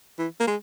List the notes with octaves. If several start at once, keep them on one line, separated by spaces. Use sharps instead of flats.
E3
A#3
G#3